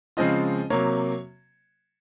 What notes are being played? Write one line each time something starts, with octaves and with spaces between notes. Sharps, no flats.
C#3 F3 G#3 C4 F4 D#5
C3 F#3 A#3 C#5